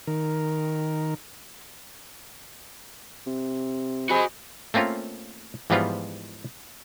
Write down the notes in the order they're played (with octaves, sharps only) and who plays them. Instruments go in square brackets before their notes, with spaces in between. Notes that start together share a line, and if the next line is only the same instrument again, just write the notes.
[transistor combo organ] D#3 A#4
[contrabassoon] C3
[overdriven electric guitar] F#4 G#5 [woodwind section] G#4 C5 D#5 [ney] B5
[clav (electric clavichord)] A3 A#3 C4 C#4 F4
G#2 E3 F3 G3 B3 F4